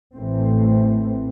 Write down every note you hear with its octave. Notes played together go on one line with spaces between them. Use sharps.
A1 A2 E3 A3 C4